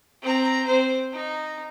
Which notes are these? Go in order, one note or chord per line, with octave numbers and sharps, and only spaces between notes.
C4 A#5
C4 C5
D#4